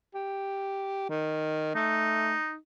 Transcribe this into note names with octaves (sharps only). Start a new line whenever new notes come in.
G4
D#3
A3 D#4